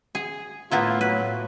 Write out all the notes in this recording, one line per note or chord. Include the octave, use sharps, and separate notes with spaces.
G#4
A2 A#3 B3 E4 F4
F#3 B4